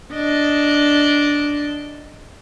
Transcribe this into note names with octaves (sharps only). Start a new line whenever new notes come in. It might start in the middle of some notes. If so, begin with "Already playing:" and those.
D4 D#5